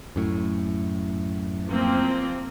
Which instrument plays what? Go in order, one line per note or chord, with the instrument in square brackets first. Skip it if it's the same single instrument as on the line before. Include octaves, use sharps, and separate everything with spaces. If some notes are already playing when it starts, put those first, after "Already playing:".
[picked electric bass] F#2 A2
[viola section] F3 A#3 C4